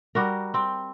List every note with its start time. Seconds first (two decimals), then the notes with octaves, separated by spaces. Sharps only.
0.15 G3 F#4 A#4
0.54 C4 G5